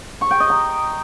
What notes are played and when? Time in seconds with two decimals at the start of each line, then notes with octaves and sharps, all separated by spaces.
0.21 C#6
0.31 G5
0.40 D#5
0.50 A#5